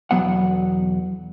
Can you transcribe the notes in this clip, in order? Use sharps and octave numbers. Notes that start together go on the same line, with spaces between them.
B1 E2 B2 F#3 B3 F#5